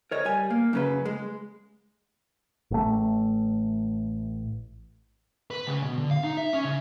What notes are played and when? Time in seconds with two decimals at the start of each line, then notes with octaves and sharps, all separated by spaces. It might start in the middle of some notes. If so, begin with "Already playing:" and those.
0.11 A#4 C#5 D#5
0.25 G3 G#5
0.50 A#3
0.73 F#2 C#3 B4
1.05 G#3
2.71 A1 A3
5.51 B4
5.67 C#3
5.82 B2
5.98 D3
6.11 F5
6.24 D#4
6.37 E5
6.53 C#4
6.65 C#3